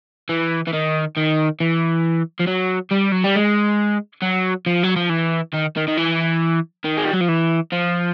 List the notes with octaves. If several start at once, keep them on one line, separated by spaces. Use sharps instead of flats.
E3
E3
D#3
D#3
E3
F3
F#3
G3
F#3
G3
G#3
F#3
F3
F#3
F3
E3
D#3
D#3
D#3
E3
D#3
G#3
G3
F#3
F3
E3
F3